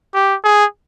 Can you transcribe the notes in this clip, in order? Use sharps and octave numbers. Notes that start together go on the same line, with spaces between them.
G4
G#4